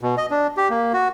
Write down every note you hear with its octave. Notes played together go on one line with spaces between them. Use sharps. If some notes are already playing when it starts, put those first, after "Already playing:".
B2
D#5
D4
G4
A#3
F#4